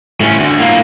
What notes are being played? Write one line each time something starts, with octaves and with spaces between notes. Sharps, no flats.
A2 C#4
D2
A2 A#3